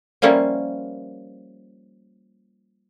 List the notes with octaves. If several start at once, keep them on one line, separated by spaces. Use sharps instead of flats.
F3 G3 A#3 C#4 E4